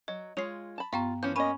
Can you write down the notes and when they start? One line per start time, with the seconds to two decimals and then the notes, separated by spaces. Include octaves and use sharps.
0.08 F#3 D#5
0.37 G#3 F4 C#5 C7 F7
0.78 A5 B5
0.93 G2 B3 F4 F5 G5 A#5 C#6
1.23 E3 F3 C#4 G6
1.36 A#3 C#4 D#5 B5 C#6 D#7